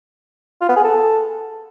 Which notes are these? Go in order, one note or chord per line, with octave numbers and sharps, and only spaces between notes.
F4
B3
G#4
A4